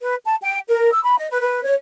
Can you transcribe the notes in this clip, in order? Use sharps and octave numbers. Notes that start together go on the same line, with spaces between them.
B4
A5
G5
A#4
E6
B5
D#5
B4
B4
C#5